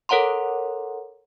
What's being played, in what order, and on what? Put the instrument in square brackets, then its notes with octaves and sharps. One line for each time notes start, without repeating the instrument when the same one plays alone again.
[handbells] A4 A#4 C#5 F#5 A#5 C6